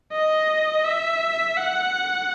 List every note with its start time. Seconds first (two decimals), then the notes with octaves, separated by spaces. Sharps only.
0.12 D#5
0.84 E5
1.57 F#5